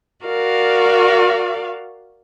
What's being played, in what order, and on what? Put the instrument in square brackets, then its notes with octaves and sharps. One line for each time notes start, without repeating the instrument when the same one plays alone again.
[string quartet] F#4 A#4 D5 F5